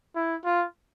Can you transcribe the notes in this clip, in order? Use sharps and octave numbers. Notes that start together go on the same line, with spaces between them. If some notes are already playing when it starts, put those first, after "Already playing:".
E4
F4